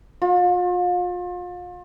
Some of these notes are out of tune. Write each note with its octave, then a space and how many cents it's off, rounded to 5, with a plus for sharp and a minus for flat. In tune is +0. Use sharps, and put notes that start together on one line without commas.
F4 +35